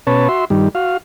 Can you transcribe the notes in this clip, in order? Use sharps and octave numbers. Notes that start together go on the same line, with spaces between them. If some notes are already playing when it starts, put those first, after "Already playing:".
B2 C#4 B4 C#5 A5
F#4 E5 C6
G2 D#3 G3
F#4 F5